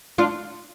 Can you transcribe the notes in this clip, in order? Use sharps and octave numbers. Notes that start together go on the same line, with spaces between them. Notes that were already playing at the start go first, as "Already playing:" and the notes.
D4 F4